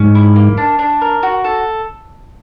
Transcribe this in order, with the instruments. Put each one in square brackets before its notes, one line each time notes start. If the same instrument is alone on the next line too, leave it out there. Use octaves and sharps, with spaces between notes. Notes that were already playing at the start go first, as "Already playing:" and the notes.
Already playing: [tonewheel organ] G#2 [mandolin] C#4
[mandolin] E4
A#3
D4
D4
A#4
F#4
A4